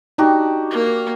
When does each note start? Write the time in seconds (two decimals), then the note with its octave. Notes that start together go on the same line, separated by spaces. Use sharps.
0.18 D4 D#4 F#4 G4
0.71 A#3 A#4